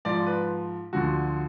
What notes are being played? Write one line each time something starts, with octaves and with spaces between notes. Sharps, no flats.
G#2 F3 D5
B4
D2 D3 F3 F#4